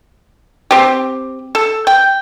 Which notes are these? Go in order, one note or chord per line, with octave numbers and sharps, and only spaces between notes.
C4 G4
A4
G5